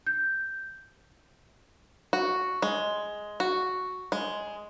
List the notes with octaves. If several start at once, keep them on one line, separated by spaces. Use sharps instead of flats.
G6
F#4
G#3
F#4
G#3